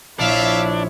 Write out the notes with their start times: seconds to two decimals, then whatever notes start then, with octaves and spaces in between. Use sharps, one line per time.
0.19 A#1 D4 E4 C#5 E5 F5